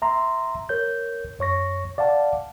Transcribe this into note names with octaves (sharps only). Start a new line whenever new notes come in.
E5 A#5 C6
A#4 C#5 G6
F#2 C#5 C#6 A#6
D5 F5 F#5 A5